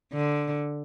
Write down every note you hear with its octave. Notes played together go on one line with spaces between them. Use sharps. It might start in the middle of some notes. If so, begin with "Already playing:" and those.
D3